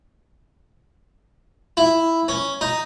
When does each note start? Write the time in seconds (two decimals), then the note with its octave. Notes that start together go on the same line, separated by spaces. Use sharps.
1.77 E4
2.28 C#4
2.61 D#4